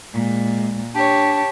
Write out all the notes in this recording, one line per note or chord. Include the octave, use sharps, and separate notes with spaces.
A#2 G#3
D4 G4 C#5 A5